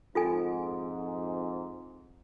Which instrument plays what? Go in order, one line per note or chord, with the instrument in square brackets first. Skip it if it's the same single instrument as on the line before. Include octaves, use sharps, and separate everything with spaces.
[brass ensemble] F2 G#2 [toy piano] F4 A4 G#5